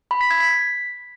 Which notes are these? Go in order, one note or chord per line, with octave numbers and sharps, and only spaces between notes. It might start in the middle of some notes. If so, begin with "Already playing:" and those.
B5
B6
G#6
B6